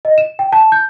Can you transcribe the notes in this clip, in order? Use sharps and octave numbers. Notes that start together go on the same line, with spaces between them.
D#5
E7
G5
A5
G6